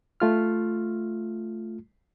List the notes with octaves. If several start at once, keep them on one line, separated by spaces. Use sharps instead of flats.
A3 F4 F6